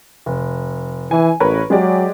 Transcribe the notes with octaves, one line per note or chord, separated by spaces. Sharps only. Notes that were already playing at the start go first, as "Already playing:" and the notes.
F1
E3 G#5
A1 A#4 B4 C#5
F#3 G#3 G4 D5